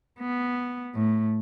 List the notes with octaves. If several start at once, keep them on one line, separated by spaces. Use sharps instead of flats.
B3
A2